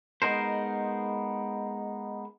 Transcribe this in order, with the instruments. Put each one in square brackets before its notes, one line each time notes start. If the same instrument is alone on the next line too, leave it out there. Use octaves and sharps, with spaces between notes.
[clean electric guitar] G#3 B3 D#4 A#4 C5